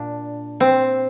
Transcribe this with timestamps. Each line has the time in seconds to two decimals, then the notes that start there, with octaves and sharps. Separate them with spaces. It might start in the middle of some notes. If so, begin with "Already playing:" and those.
Already playing: A#2 D4
0.60 C4